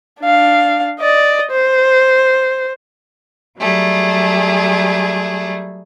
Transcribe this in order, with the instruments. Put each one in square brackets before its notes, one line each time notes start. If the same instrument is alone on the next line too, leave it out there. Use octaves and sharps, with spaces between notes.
[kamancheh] D4 F5
D5 D#5
C5
[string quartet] F#3 G3 A3 G#4